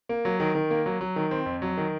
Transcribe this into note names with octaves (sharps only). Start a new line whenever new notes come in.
A#3
F#3
D#3
D#3
A#3
F#3
F#3
D#3
C4
F2
F#3
D#3